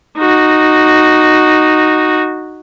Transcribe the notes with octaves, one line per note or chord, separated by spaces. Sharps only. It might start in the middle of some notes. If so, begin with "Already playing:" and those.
D#4 F#4